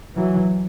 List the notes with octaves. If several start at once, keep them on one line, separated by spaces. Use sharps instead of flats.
E3 F#3